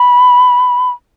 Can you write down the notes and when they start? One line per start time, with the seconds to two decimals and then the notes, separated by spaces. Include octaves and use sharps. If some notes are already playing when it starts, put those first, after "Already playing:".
Already playing: B5